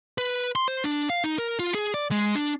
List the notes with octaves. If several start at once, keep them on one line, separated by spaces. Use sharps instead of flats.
B4
C6
C5
D4
F5
D#4
A#4
F4
G#4
D5
G#3
D4